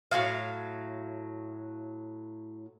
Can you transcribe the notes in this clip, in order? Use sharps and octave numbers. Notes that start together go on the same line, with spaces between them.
A2 F3 F#3 F5